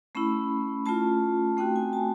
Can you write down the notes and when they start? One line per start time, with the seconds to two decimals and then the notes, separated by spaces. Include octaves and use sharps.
0.15 A3 C#4 E4 B5
0.86 A3 C#4 F4 A5
1.57 A3 C4 D#4 F#4 G5
1.76 G#5
1.93 A5